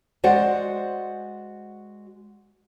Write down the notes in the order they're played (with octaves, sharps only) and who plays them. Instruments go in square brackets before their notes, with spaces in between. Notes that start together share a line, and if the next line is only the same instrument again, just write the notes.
[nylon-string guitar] G#3 F#4 C5 D5 F#5